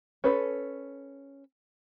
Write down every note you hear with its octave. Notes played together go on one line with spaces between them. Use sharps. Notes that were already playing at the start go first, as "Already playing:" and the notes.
C#4 A4 B4